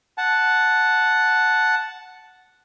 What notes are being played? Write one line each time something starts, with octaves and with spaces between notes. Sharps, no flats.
F#5 A5